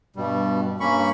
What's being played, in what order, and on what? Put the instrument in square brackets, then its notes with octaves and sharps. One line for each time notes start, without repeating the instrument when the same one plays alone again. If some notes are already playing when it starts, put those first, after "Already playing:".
[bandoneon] G2 B2 G3
G2 A#3 C#4 B5 C#6